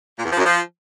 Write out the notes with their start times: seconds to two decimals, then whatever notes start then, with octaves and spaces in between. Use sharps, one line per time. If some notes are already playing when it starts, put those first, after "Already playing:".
0.17 A#2
0.24 E2
0.31 F3
0.37 F#2
0.44 F3